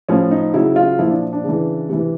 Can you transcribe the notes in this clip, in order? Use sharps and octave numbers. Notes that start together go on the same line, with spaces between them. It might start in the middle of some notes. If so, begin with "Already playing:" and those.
A2 F3 C#4
D#4
C#3 F#3 E4
F4
A#2 F3 E4
D4
D4
C#3 E3
C3 E3